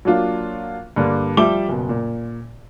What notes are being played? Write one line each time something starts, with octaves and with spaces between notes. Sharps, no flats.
F#3 A#3 D4 F4
G2 D3 A#3 D4
F3 G3 E5 D6 G7
F#1 B2
A#2